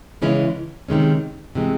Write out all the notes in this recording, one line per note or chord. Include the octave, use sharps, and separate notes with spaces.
C#3 E3 G#3 C#4 E4
C3 D#3 G#3 C#4
C3 E3 G#3